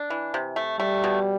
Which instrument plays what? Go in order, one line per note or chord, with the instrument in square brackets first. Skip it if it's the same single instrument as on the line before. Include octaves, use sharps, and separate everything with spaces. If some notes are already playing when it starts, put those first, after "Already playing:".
Already playing: [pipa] D4
E3
C3
A3
[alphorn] G3 [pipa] A3
[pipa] B2